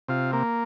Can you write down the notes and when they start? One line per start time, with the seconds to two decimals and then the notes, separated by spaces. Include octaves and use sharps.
0.08 C3 F4
0.33 A#3